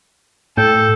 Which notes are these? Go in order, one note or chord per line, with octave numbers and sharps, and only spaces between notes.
A2 A4 G5